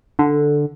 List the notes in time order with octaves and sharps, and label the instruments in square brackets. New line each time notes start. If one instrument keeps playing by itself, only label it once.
[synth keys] D3